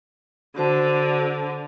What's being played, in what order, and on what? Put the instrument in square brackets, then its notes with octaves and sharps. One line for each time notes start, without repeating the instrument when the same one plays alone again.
[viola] D3 [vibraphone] F#4 C5 A5